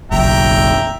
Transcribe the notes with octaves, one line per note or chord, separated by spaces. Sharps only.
F#1 B1 E5 G5 A#5